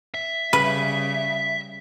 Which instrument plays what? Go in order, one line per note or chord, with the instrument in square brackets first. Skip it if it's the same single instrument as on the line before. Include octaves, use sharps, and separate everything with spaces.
[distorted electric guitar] E5
[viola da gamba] C#3 G3 [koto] B4